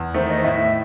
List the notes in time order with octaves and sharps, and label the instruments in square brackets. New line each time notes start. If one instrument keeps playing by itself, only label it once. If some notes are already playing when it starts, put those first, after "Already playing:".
Already playing: [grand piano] E2
[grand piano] D#3 A3 [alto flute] C5
[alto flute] D#5
[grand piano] A2 [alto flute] E5